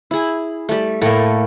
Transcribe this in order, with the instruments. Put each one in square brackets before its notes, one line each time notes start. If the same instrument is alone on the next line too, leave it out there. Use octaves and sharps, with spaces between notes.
[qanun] E4 G#4
G3 A3
[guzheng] A2 A#3 [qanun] A3